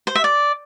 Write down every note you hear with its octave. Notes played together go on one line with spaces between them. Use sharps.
C5
E5
D5